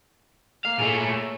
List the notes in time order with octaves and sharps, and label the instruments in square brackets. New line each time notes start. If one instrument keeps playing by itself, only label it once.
[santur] A#3 [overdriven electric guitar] F5
[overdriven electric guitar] A#2 A3 [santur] G#4 C#5 E5